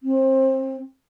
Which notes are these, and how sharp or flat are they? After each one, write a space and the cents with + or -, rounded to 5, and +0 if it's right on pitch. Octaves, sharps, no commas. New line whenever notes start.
C4 +25